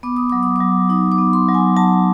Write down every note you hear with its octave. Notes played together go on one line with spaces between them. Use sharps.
B3 D6
D#6
F#3 D6
D#6
F#3 D6
D#4 D#6
D6
B3
C6
F#3
G#5
F#3 A5